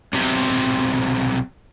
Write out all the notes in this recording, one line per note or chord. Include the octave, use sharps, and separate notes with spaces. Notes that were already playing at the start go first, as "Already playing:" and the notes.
B1 C3